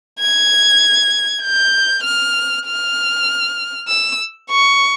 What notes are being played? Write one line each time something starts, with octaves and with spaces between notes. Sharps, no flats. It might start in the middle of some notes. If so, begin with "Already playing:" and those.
G#6
G6
F6
F6
E6
C#6